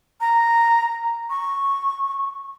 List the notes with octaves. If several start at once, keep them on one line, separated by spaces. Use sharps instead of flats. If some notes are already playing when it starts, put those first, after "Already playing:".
A#5
C#6